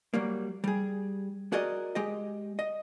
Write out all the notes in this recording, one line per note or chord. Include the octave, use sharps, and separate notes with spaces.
F#3 G3 A#3
G3 G#4
F#4 G#4 A#4 D5 D#5
G#3 G4 D#5
D#5